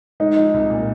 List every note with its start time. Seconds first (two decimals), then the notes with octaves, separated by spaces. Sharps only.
0.20 G#3 D#4
0.37 F3
0.54 C2
0.70 A#2